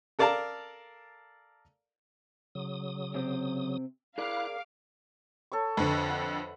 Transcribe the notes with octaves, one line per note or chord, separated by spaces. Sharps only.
A4 A#4 D5 F5 A5 A#5
C#3 F#3 D#6
C3 C4
E4 G#4 A#4 D5 F5 D6 F#6
A4 C#5 C#6
F2 D3 B4 E5
F#5